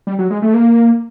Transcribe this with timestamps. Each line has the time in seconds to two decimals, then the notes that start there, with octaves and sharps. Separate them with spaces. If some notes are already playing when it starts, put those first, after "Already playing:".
0.07 G3
0.19 F#3
0.30 G#3
0.42 A3
0.54 A#3